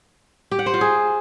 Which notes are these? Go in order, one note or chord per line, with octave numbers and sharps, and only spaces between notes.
G4
F#5
C5
F4
G#4